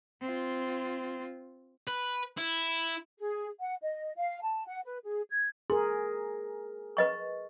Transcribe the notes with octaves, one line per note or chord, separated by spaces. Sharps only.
C4 F4
B4
E4
G#4
F#5
D#5
F5
A5
F#5
B4
G#4
G#6
G#4 A#4 C6
B4 D#5 C#6